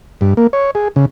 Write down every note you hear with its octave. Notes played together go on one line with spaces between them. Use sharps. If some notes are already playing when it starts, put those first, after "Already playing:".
G2
A#3
C#5
G#4
C#3